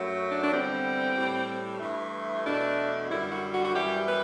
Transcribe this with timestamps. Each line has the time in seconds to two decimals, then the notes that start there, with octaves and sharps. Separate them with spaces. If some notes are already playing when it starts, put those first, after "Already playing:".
Already playing: F#2 F#3 A3
0.29 D4
0.43 D4
0.51 E2 D3 G3 C4
1.15 A2 G3
1.80 G2 E3 A3
2.44 E2 B2 A3 D4
3.09 F#2 D3 G3 E4
3.30 F#4
3.52 F#4
3.63 F#4
3.73 F#2 E3 G3 G4
4.06 B4